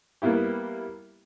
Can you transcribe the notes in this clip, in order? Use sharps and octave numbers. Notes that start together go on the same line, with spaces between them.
G3 A#3 B3 E4 G4